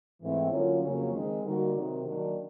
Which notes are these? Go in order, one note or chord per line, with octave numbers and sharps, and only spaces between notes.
G#2 E3 A3 C4 E4
D3 F#3 A#3 C#4 F4
F2 C#3 F#3 A#3 C#4
D#3 G#3 C4
D3 G3 A#3 D#4 F#4
C3 D#3 F#3
D#3 F#3 A#3 D4 F#4